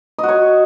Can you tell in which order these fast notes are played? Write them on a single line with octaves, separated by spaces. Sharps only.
D#5 F#4 C#5